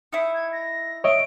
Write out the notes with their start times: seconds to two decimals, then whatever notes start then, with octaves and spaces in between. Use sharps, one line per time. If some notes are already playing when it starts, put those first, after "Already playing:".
0.13 D#4 E4
0.35 G#6
0.53 A#6
1.04 C#5 D#5 E5 D7